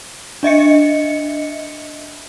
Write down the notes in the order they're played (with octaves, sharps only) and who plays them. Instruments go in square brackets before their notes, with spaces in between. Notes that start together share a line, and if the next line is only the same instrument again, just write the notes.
[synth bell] D4 D#5 E5 C#7